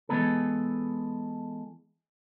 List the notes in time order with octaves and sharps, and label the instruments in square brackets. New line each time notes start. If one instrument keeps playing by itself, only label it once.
[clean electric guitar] E3 F3 G#3 B3 G#4 A4